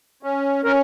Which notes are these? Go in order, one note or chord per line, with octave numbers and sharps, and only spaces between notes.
C#4
C#4 A#4